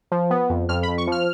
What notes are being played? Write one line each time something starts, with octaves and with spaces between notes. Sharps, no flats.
F3
B3
F2
F2 F6
B5
F2
C#6
F3 F6